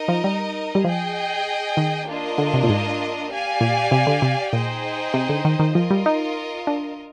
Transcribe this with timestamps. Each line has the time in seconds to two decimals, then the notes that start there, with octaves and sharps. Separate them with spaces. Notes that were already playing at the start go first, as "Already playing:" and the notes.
Already playing: D#4 A#4 D#5
0.08 F3
0.24 G3
0.75 G3
0.84 F3 G#4 D#5 G5
1.77 D#3
2.07 A#3 D4 F4 A#4 D#5
2.38 D3
2.54 C3
2.63 A#2
2.69 G#2
3.30 G4 D5 F5 G#5
3.61 A#2
3.91 C3
4.07 D3
4.22 C3
4.53 A#2 D#4 G#4 C5 D#5 G5
5.14 C3
5.29 D3
5.45 D#3
5.60 D#3
5.75 F3 F4 A#4 D#5
5.90 G3
6.06 D#4
6.67 D4